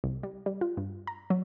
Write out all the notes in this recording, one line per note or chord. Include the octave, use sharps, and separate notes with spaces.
C2
G3
G3
F4
G2
A#5
F#3